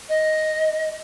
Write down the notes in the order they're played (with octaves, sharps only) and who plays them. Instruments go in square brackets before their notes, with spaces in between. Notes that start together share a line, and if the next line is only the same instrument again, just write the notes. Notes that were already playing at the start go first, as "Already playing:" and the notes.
[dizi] D#5